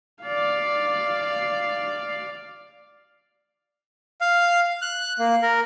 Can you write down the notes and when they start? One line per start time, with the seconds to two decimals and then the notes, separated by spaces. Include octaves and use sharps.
0.23 D5 F5
4.21 F5
4.82 F#6
5.19 A#3
5.42 A#4